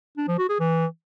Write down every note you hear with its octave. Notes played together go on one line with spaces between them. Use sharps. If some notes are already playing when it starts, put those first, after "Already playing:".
D4
F3
F#4
G#4
E3